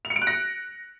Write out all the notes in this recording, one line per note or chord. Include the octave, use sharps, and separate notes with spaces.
F7
C#7
D7
F#6
A#6